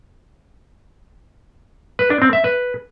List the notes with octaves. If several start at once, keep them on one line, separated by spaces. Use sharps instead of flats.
B4
D4
C4
E5
B4